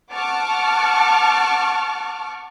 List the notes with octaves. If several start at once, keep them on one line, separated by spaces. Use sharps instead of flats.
F#5 A5 C#6 D6 F6